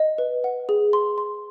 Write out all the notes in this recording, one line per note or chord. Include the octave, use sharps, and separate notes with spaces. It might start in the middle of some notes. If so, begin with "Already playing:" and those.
Already playing: D#5
B4
F#5
G#4
C6
C6